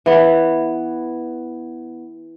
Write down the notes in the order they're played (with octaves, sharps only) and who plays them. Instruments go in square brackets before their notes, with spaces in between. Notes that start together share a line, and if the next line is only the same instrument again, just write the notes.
[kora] E3 B3